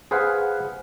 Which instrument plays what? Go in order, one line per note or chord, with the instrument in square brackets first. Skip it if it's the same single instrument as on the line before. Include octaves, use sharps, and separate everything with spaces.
[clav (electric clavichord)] G#4 B4 C5 F5 F#5